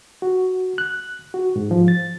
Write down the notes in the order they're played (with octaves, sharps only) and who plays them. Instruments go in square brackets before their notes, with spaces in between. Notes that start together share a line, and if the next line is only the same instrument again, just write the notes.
[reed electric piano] F#4
F#6
F#4
G#2
F3
A6